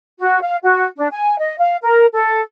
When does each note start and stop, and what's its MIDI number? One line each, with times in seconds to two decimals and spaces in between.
0.19 0.39 66
0.42 0.57 77
0.63 0.84 66
0.97 1.08 62
1.12 1.37 80
1.38 1.54 75
1.59 1.76 77
1.82 2.06 70
2.14 2.40 69